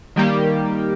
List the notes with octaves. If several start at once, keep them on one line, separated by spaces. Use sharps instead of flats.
D#3 G3 A#3 G4